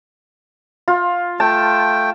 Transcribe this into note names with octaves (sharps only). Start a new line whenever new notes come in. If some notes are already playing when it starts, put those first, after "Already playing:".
F4
A3 G5 A5